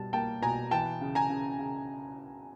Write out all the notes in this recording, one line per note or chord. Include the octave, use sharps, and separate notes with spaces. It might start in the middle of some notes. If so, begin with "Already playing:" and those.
Already playing: B2 G3 A5
A#3 G5 A5
B2 G#5 A#5
E3 G5 A5
C#3
G#5 A#5
C#3
C#3